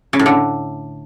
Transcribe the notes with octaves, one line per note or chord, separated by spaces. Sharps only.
C#3
A2
D3